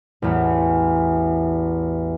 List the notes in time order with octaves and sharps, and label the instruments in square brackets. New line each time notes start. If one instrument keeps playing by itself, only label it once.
[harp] A1 E2